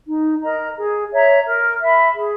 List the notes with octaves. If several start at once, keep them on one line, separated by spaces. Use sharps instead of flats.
D#4
A#4 D#5 A#5
G#4
C#5 E5 A#5
A#4
E5 B5
G#4